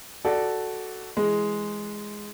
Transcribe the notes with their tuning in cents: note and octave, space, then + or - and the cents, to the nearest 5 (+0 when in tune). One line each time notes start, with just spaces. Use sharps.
F#4 +10 A4 +0 D5 +0
E3 +10 G#3 +0